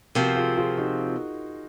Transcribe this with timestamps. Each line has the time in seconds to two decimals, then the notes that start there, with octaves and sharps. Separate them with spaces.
0.15 C3 F3 C4 F#4 A#4
0.36 F4 G#4
0.57 F4 G#4
0.78 D#4 F#4